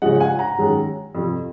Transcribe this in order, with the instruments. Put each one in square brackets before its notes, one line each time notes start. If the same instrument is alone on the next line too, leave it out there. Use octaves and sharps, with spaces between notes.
[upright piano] C#3 F3 G#3 D#5 F#5
F#5
F5 G#5
F#5 A#5
F#2 D#3 G#3 C#4
F2 C3 F3